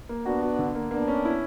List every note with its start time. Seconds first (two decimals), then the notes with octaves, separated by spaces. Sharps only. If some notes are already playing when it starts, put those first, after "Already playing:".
0.09 A#3
0.26 B3 D4 F#4
0.42 F#4
0.59 D3
0.75 A#3
0.91 A#3 B3 D4
1.08 C#4
1.25 E4